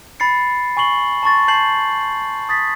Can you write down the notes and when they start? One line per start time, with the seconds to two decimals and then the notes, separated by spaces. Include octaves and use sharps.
0.20 B5 A6 C7 C#7
0.77 G#5 C#6 C7 F#7 G7
1.23 A5 C6 C#6 A6
1.48 A5 G6 C7 F#7
2.49 D#6 A6 B6